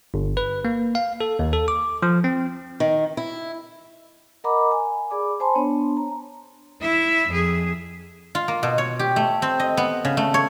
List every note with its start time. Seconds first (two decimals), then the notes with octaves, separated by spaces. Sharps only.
0.14 G1
0.37 B4
0.65 A#3
0.95 F5
1.21 A4
1.39 D#2
1.53 A4
1.68 D6
2.02 F3
2.24 C4
2.80 D#3
3.17 E4
4.44 A#4 D#5 F#5 A#5 B5 D6
4.71 G#5
5.11 G#4 D5 B5 D6
5.40 C5 G#5 A5 B5 C6
5.55 B3 D4 C#5 A5
5.97 A#5
6.81 E4 E5
7.28 F2 G#4
8.35 F4
8.48 A#3
8.63 B2
8.78 C#5
8.99 G4
9.16 A3
9.42 C4
9.60 D#5
9.77 B3
10.05 C#3
10.17 A3
10.34 C#5